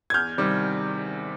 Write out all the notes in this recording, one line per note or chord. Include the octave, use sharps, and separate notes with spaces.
G#6
E2 F6 G6
C3 D#3 G3